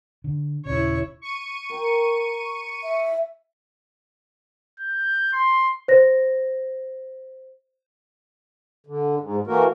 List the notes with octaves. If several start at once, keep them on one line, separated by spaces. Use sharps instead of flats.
D3
D#1 C#3 E4 C#5
C#6 C#7 D#7
A#4 G5
E5
G6
C6
C5 A#6
D3
G#2
E3 A3 A#3 F#4 A#4